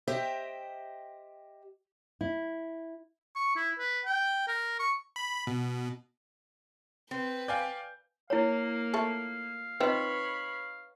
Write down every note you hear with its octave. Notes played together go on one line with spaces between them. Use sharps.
G4 C5 D#5 E5 G5
E4
C#6
E4
B4
G5
A#4
C#6
B5
B2
C4 B4
D5 F5 G5 G#5 G6
A#3 E4 C#5 F5
F3 A3 A5
C4 D#4 F4 B4 C#5 D#5 B5